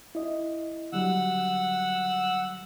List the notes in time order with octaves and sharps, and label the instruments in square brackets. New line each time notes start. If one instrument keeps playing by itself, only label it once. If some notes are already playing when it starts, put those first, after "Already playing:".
[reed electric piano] E4 D#5
[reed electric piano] D3 F#3 G3 [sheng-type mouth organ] F#5 E6